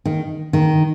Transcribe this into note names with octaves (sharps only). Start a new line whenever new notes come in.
D#3
D#3